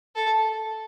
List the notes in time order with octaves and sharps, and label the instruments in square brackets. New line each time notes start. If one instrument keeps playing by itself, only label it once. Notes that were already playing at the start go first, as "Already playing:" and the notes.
[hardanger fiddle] A4